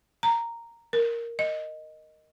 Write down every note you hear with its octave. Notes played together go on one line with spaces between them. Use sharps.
A#5
A#4
D#5